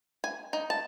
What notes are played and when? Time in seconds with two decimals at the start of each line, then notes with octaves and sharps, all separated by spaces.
0.24 G#5
0.53 D#4
0.70 A5